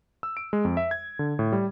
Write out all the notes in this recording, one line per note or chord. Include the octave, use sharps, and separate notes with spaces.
E6
D7
G#3
F2
E5
G#6
D3
A2
G3